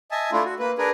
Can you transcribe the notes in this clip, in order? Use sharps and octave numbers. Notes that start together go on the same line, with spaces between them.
D#5 E5 G#5 A5
A3 D4 E4 F4
F#4
A#3 B4
D4 G#4 A#4 B4